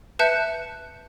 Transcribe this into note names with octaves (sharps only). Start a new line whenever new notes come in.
B4 E5 A5 F#6 G6 C#7